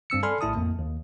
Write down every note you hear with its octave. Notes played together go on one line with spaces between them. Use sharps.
G2 C4 E6 C#7
A4 D5 G#5 B5 C6 F6
A#1 A2 E4 A5 D#6
F2 A#3
D#2